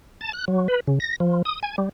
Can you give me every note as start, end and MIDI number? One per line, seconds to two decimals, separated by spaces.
0.21 0.32 81
0.33 0.45 90
0.48 0.68 54
0.68 0.80 71
0.87 0.99 49
1.00 1.16 94
1.20 1.42 53
1.45 1.60 87
1.63 1.76 80
1.78 1.89 55